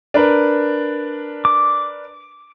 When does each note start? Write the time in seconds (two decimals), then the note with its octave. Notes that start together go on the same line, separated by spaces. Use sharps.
0.14 D4 A#4 B4
1.45 D6